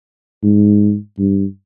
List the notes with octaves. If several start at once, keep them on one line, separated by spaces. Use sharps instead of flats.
G#2
G2